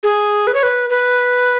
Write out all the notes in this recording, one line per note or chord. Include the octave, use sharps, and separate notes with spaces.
G#4
B4
C#5
B4
B4